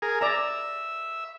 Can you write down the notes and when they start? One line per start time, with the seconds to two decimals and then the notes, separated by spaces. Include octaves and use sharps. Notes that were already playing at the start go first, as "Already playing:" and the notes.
0.02 G#4 A#4
0.21 D5 E5 A#5